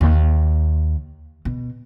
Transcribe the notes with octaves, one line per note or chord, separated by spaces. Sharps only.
D#2
B2